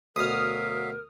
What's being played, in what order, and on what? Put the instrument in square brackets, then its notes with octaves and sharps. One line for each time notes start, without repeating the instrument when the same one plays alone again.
[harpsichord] D2 B2 [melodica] F#3 E5 F5 [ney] A#4 [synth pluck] D#6 F6